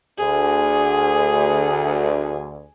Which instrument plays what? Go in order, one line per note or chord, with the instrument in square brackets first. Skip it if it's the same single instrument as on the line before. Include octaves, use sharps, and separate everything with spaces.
[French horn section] D2 [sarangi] G#4